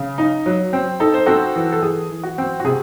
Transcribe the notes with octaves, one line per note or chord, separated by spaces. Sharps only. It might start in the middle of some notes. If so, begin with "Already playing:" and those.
Already playing: C#3
D#4
F#3
C4
D#4 A4
C5
C4 F#4 A4
E3
A4
E3 G#4
E3
F#4
C4
F#4
C3 G#4